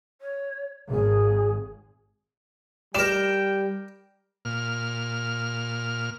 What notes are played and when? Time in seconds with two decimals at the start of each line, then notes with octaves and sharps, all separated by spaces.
0.21 C#5
0.90 G#1 G#4
2.95 G3 A#4 D5 G5 E7
4.45 A#2 F6